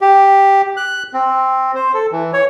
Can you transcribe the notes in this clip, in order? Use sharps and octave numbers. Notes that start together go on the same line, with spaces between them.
G4
F#6
C4
C5
A4
E3
C#5